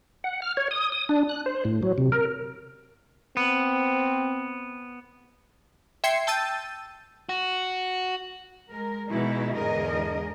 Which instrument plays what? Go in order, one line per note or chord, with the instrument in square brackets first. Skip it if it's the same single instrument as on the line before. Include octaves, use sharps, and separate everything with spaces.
[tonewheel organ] F#5
F6
C#5
D#6
D#6
D4
F#6
C5
A2
F#3
C3
A#4
[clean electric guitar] B3 [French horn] C4
[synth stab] E5 G5 C6 G#6 C7 C#7
G5 A5 E6 G6 A6 D#7
[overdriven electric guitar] F#4
[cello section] G#3 A#4
B2 E3 G#3 D#4 E4
E2 G#2 D3 G#4 A#4 D#5